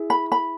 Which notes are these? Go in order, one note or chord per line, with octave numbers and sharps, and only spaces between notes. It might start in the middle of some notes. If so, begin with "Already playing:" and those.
Already playing: E4 G#4
B5
B5